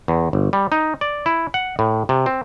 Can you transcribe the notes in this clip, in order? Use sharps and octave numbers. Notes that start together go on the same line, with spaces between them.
E2
G1
G3
D#4
D5
E4
F#5
A2
C3
C4